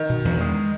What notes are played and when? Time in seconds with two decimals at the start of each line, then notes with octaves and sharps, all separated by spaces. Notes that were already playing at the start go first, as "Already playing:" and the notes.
Already playing: D#3
0.10 B2
0.25 E2
0.40 G#3